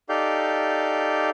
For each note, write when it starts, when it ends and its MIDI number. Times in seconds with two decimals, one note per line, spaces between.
0.09 1.30 63
0.09 1.30 67
0.09 1.30 69
0.09 1.30 74
0.09 1.30 77
0.09 1.30 91